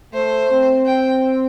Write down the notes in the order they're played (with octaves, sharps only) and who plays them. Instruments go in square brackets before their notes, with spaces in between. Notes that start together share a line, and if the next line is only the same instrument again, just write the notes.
[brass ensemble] A3 [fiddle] C5
[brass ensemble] C4
[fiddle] G5